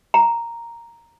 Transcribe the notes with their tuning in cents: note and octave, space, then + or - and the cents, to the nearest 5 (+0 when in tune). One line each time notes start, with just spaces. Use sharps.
A#5 +0